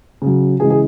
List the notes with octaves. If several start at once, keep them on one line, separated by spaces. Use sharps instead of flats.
C#3 F#3
C#3 E3 G#3 G#4
G#4